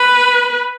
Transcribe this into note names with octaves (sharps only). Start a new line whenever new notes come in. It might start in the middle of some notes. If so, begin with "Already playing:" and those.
Already playing: B4